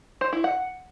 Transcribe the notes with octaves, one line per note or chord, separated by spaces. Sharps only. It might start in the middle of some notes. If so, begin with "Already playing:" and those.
C5
E4
F#5